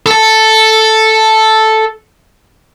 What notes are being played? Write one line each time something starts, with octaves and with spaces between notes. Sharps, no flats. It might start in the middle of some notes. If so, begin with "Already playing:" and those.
A4 A5